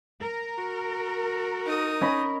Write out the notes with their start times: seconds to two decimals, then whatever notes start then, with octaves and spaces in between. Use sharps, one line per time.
0.21 A#4
0.58 F#4
1.66 D#4 D#6
2.01 C#4 D#5 B5